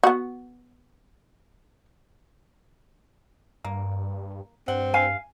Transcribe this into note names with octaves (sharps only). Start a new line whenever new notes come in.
B3 F#4
G2 A#3
G2 C4 F#5
F5 G#5